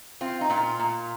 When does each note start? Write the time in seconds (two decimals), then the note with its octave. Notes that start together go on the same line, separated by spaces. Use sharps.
0.21 C4 F4
0.41 D#4
0.50 A#2 F4
0.79 A#2